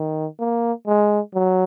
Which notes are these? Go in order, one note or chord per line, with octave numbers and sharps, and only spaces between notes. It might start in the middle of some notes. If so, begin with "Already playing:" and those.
Already playing: D#3
A#3
G#3
F#3